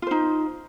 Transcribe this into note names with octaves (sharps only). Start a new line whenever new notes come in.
D#4 F4 C5